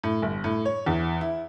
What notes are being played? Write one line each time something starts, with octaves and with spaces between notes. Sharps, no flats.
A2
G1
A2
C#5
E2
E4